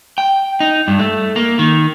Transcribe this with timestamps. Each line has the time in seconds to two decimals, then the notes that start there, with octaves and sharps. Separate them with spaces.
0.18 G5
0.60 D#4
0.88 G2
0.99 A3
1.36 A#3
1.59 D#3